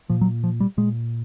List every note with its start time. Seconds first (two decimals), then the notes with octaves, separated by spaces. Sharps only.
0.10 A#2 F3
0.21 F#3
0.44 F3
0.60 G3
0.77 A#2 G#3